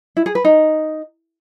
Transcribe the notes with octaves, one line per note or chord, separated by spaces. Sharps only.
E4
G#4
B4
D#4